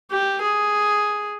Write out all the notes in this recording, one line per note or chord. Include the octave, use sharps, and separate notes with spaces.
G4
G#4